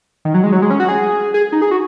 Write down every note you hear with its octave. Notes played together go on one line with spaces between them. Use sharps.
D#3
F#3
G#3
F#3
G#3
C#4
F#4
G#4
G#4
D#4
G#4
F#4